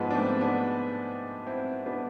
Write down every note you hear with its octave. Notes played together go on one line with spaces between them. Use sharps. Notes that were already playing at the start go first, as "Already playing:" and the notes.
Already playing: G#2 F3 G#3 B3
D4
A3 C4
B3 D4
C4 E4
B3 D4